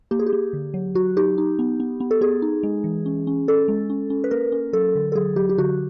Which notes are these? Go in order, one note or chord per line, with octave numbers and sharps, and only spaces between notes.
A#3 G4
G#4
G4
A#3
D3
F#3
F#3 F#4
D#4 G4
D#4
B3
B3
B3
A4
B3 G#4
D#4
G#3
E3
C#4
C#4
C#4 A4
G#3
C#4
C#4
B4
A#3 A#4
C#4
F#3 A4
D3
A4
F#3 G#4
F#3 G4
G4
D3 F#4